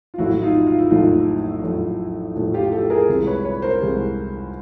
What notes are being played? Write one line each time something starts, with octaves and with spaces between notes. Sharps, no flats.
F4
A#1 A2 F#3 A3 E4 F#4
E4
D#4 F4
F4
E4
A#1 A2 F#3 A3 D#4 F4
A#1 A2 F#3 A3
A#1 A2 F#3 A3
F4 G4
G4 A4
G#4 A#4
C2 C3 E3 G#3
B4 C#5
B4 C#5
A#4 C5
C2 C3 E3 G#3